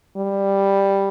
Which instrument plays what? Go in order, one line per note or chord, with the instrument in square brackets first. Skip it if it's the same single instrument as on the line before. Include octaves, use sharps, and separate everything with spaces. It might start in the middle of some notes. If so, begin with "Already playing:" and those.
[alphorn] G3